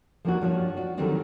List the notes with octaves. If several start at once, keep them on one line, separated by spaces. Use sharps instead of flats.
F3 G3 A#3 C#4 D4 F#4
G2 F3 D4 C#5
D4 F#4
D3 D#3 F#3 G3 C4 D4